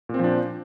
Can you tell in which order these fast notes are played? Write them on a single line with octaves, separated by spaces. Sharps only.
A#2 C4 F3 D4